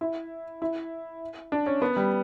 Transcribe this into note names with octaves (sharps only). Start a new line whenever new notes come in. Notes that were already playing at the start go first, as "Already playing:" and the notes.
E4
E4
D4
C#4
B3
G3